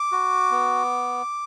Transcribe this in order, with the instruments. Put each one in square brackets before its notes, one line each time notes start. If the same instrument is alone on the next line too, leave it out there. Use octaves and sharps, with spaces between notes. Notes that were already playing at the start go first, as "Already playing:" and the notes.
Already playing: [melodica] D6
F#4
B3